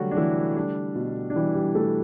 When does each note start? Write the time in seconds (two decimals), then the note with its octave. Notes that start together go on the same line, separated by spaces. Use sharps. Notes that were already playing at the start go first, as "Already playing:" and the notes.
Already playing: D3 F#3 G3 A3 F#4
0.11 D4
0.17 E3 A3 E4
0.57 G3 D4
0.96 B2
1.30 D4
1.35 E3 G3 E4
1.55 G3 G4
1.75 B2 A3 A4